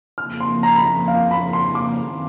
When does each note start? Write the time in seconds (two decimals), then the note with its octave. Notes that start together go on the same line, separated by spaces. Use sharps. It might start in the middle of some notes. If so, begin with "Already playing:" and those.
0.17 F2 C#3 F3 A#3 F6
0.40 C6
0.63 A#5
0.76 B5
0.85 A#5
1.08 F5
1.31 B5
1.53 C6
1.75 D6
1.98 F#2 D#3 C4